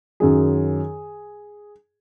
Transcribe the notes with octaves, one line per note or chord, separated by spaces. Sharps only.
F#2 D#3 F#3 G#4